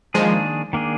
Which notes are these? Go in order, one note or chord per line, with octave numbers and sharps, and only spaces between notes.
D#3 F3 G#3 A#3 D4 G#4
D#3 A#3 D4 G#4